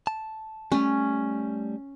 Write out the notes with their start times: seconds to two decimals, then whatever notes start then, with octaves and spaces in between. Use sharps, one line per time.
0.07 A5
0.72 G3 A3 C#4